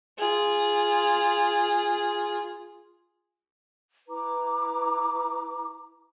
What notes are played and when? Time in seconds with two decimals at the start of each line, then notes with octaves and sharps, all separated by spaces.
0.18 F4 G#4
4.08 E4 B4 A#5 D6